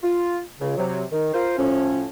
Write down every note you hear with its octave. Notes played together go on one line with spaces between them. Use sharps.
F4
C#2 C#3
C3 F#3
D#3
F4 A#4 C5
A2 F3 C#4